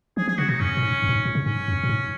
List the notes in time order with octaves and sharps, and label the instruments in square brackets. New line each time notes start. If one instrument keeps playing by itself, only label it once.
[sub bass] F3 [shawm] G#4
[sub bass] F3 [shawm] G#4
[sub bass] C#3 [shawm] F#4
[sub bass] B2 [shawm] D#4
[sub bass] F#2 [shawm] C#4
[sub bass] A#2
G#2
F#2
A#2
G#2
A#2
C#3
[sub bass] G#2 [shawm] C#4
[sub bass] F#2
A#2
G#2